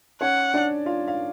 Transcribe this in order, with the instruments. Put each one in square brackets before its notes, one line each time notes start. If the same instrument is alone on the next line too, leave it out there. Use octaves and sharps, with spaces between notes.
[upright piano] C#4 C#5 [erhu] F#5
[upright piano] D4 D5
F4 F5
F5